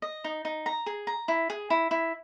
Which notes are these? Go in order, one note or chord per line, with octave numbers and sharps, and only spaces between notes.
D#5
D#4
D#4
A#5
G#4
A#5
E4
G#4
E4
E4